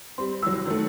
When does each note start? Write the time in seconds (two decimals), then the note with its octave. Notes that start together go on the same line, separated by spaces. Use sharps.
0.18 G3 C4 C6
0.43 C2 F#3 E6
0.66 D#3 F#3 A3